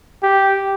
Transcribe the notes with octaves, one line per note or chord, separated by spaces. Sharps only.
G4